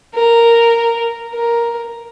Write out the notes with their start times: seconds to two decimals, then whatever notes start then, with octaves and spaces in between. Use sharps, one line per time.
0.14 A#4
1.34 A#4